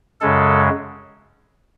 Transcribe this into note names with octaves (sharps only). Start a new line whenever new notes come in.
F#2 C#3 G#3 A4